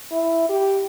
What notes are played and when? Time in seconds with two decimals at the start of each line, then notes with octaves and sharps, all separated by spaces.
0.11 E4
0.49 G4